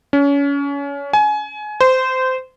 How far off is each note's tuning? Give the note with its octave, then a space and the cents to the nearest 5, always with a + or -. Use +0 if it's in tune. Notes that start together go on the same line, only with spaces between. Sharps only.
C#4 +30
G#5 +25
C5 -20